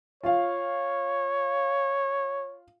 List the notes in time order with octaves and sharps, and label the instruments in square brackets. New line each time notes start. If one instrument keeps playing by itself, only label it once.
[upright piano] F4 F5 [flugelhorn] C#5